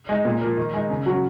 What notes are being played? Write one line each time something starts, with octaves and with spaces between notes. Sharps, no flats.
G#3 D#4
A#2
F3 A#3
D#3
G#3 D#4
C#3
F#3 C#4